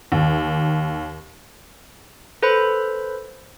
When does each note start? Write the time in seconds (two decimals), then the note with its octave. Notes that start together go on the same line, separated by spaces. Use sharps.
0.12 D#2
2.43 A4 B4 C5 B5